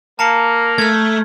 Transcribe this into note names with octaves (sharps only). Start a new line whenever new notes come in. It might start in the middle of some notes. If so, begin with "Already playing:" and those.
A#3 A5 A#5 C#7
A3 F6 G#6